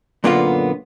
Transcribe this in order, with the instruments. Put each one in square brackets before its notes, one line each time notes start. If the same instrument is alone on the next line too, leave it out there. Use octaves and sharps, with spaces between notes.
[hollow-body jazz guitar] F#2 A#2 D3 A#3 B3 F4